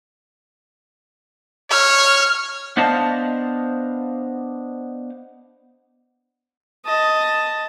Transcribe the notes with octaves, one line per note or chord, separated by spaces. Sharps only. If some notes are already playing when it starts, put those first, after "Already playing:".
C#5 F6
B3 D4 C5 D#5 F5 A5
D#5 A5